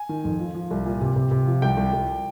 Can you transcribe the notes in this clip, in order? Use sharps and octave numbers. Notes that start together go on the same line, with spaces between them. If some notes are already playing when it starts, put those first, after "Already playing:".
Already playing: G#5
D#3
F2
F3
F3
C2
A#2
C3
C3
C3
F3
C2 G5
C2
C2